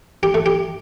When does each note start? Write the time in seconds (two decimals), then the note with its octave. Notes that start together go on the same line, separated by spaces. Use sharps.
0.23 G4
0.34 A3
0.46 G4